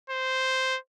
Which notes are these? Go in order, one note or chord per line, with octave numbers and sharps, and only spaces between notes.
C5